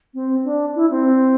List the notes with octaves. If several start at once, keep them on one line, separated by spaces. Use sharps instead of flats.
C4
D4
E4
C4